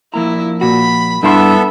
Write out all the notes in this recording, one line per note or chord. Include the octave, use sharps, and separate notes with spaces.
F3 A#3 E4 A#5
A#2 F#4 B5
G2 B3 D4 E4 A4 E5 F#5 C6